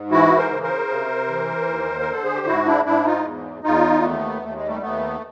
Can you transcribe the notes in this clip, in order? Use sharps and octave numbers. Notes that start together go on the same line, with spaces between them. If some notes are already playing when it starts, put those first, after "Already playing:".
Already playing: G#2
E3 E4 F#4
A#4 C5
C#3
A#4 C5
C3
E3
D#2
A#4
D3
A4
G#4
G4
G#2 E4 F#4
D4 E4
G#2 D4 E4
D#4 F4
E2
E2 D#4 F4
D#2 A3 B3
D#2 A3
G#3
G3 A3
D#2 A3 B3